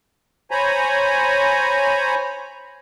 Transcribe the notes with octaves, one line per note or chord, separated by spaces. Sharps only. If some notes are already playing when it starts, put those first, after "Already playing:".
C5 C#5 G#5 A#5 B5